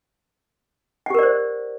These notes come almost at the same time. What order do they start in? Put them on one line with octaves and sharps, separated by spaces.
F#5 G4 A#4 D5 C5